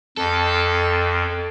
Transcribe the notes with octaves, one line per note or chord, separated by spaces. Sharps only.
F2 A4